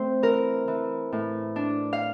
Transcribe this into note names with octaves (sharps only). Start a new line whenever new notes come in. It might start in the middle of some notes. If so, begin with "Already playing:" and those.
Already playing: A3 C4 C5
E3 A#4
E3
A2
D4
F5